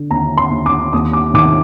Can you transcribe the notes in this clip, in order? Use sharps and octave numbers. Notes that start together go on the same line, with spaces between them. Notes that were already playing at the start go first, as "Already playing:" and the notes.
Already playing: D3
D#2 A#5
C6
D#2
D6
D#2 D#6
D6
D#3 D6